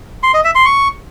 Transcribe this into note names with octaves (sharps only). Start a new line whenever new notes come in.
C6
D#5
E5
C6
C#6